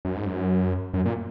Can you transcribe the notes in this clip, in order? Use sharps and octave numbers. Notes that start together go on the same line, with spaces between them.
F#2
G#2
F#2
F#2
A#2